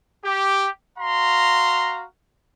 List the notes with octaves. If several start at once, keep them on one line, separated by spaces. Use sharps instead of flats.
G4
F#4 F5 A#5 C6